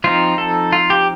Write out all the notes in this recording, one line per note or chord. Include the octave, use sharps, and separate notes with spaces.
F3 C4 D#4 F4
A4
F4
G4